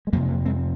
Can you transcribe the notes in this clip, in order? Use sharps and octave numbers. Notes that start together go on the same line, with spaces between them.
G#3
F2 C3 F#3 A#3
F#3 A#3
G#3 C4